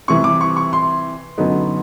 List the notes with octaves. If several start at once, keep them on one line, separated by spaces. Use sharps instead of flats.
C3 E3 G3 C#6
D6
C#6
C#6
C6
F#2 D3 F#3 B3 D#4